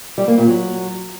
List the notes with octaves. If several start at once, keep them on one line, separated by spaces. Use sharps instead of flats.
G3
A#3
A#2
F#3